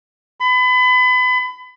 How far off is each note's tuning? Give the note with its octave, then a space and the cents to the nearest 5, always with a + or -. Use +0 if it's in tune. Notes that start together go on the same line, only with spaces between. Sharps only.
B5 +30